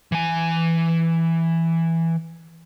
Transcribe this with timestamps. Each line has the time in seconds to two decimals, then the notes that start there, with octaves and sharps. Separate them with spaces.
0.12 E3 G#5